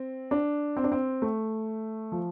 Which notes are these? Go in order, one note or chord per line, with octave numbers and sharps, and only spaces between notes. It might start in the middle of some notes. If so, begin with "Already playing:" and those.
Already playing: C4
D4
C4
D4
C4
A3
F3